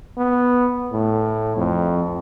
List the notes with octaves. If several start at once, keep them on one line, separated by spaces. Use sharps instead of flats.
B3
A2
F2